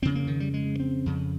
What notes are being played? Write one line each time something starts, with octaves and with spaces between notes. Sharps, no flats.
F2 C#3 C4
A#3
D#3
G3
G#3
C4
F2 C#3